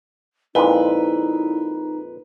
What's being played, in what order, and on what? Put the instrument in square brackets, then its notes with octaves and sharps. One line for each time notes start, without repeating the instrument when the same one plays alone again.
[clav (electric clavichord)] F2 A#2 G#3 [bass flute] D#4 [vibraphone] E4 [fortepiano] B4